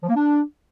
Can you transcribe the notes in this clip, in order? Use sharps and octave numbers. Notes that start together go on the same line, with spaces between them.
F3
A#3
D4